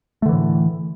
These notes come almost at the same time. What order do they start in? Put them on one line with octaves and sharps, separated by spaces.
A3 D3 E3 A2